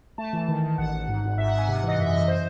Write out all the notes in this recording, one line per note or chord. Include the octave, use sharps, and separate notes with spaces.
A3 A5
E3
D#3
D#3
A1 F#5
A1
G#2
G#1
G#2 E5
F#5
G#2
G#5
C3 F#5
E3 D#5
F#2 E5
F#2 D#5
C5